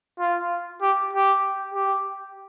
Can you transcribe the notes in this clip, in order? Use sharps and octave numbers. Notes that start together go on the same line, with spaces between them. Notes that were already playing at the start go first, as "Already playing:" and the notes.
F4
G4
G4
G4